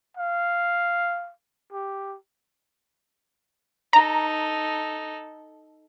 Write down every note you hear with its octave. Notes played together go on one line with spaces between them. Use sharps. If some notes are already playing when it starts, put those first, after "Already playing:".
F5
G4
D#4 A4 A#5